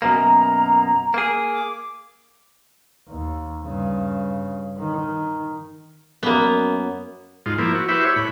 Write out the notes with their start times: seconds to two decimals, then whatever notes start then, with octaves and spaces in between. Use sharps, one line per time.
0.02 F#2 B2 A#3 A#5
1.14 A#3 G#4
1.53 D6
3.09 D#2
3.64 G2 C#3
4.78 D#3
6.23 F#2 A#3 B3
7.46 G#2 F4
7.58 F3 A#3 E4
7.75 F#4
7.89 E4 F#4 G4 B4 C5 E5
8.05 C#5
8.16 A2 B5